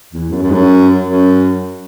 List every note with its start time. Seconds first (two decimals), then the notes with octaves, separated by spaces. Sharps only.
0.13 E2
0.30 F#2
0.42 F#2
0.50 G#2
0.54 F#2
1.02 F#2